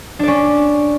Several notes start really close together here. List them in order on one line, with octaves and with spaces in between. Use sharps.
D4 D5 C#4